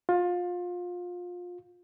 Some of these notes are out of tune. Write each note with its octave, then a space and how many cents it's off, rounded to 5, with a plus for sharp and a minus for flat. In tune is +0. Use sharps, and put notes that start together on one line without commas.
F4 +25